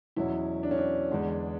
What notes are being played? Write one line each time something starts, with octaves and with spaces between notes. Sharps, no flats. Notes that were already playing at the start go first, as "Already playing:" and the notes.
E2 B2 F#3 C#4 E4
D4
C#4
D4
E2 D3 G#3 B3